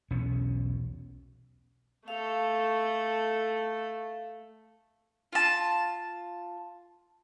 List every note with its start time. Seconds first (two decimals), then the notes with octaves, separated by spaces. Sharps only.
0.11 B1 E2 B2 C#4
2.08 A3 A4 F5
5.33 F4 A5